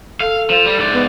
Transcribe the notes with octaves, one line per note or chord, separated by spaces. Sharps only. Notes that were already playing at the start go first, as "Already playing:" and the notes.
A4 F5
F3
G3
G#2 D5
B3